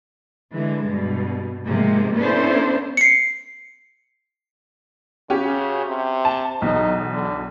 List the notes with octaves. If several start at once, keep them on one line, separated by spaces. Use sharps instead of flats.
D3 E3 G#3
G2 B2
G#2 C3 F3 G#3 A#3
B3 C#4 D4 E4 A4 C5
C7 C#7
C#3 C#4 F#4 G4
C3
A5
B1 E2 D#4
D3